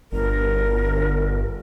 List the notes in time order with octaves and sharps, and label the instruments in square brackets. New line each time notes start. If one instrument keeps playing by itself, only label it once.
[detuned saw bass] G1 [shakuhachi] A#4